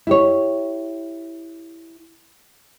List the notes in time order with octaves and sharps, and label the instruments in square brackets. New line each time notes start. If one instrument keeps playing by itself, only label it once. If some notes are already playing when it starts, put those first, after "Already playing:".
[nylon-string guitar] E4 G4 C#5